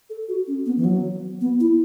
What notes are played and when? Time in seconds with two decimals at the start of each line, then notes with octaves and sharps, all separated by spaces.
0.10 A4
0.28 F#4
0.47 C#4
0.66 B3
0.77 E3
0.84 F#3
1.41 B3
1.60 E4